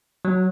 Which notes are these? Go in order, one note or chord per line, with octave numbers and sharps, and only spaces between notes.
F#3